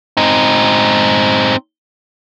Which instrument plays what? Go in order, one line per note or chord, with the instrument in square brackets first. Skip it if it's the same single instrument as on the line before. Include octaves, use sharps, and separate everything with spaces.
[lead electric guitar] C4 D#4